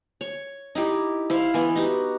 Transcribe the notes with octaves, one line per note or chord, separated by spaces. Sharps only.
C#5
D#4 E4 G4
E4 C5 F5
E3 B3
D#4 F#4 G4